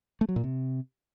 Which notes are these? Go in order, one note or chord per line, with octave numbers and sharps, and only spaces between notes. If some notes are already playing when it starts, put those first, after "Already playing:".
A3
F#3
A#2
C3